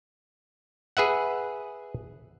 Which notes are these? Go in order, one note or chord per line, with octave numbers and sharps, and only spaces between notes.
G#4 B4 E5 F#5